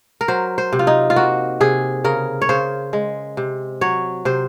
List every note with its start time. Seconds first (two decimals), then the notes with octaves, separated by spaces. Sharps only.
0.21 A#4
0.28 F#3 C5
0.58 C5
0.73 C3
0.79 F4
0.87 D#4
1.10 F4
1.16 A#3 F#4
1.60 C3 G#4
2.04 C#3 A#4
2.42 C#5
2.49 C#3 C5
2.93 G#3
3.37 C3
3.81 F#3 C#5
4.25 C3 C5